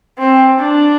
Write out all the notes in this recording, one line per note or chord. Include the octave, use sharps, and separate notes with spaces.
C4
D4